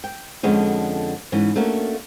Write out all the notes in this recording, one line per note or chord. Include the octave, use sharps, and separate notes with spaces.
G5
F2 D3 G#3 B3 C#4
G#2 E3 C#4
A3 A#3 C#4 D4 F#4 A#4